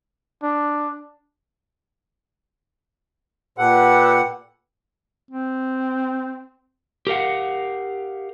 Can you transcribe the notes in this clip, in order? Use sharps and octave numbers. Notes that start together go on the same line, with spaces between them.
D4
A#2 G4 A4 B4 F#5
C4
G4 A#4 F5 F#5